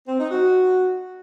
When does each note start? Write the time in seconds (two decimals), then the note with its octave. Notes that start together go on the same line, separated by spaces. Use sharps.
0.08 C4
0.19 D#4
0.31 F#4